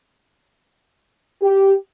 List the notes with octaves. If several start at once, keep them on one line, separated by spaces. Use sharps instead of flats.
G4